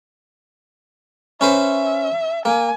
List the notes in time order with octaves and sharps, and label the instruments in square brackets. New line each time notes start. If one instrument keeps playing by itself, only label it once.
[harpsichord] C#4 B4 C5 [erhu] E5
[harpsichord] A#3 [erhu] G#5